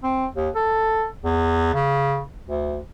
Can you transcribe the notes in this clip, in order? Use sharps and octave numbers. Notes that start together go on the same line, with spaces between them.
C4
D#2
A4
E2
C#3
D2